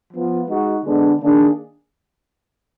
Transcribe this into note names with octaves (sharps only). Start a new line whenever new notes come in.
F3 B3 F4
G#3 D#4 F#4
D3 G#3 B3 D4
D#3 A#3 D4 G#4